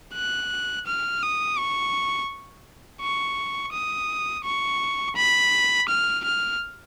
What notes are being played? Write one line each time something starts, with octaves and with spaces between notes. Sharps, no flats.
F#6
F6
D#6
C#6
C#6
D#6
C#6
B5
F6
F6